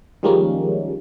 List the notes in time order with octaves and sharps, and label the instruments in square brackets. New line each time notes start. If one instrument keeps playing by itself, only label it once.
[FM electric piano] D#3 F3 G3 G#3 A#3 C#4